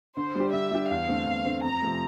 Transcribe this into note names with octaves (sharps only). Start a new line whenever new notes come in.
D3 C5
G3 D4 G4
D3 E5
G3 D4 G4
E2 F5
D3 A3 C4
E2
D3 A3 C4
F2 A#5
C3 F3 A3